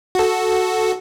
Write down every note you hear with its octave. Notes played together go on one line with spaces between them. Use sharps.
F#4 A4